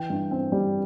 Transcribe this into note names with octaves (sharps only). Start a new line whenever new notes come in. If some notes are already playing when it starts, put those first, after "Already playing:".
Already playing: E3 G5
G2
C4
G3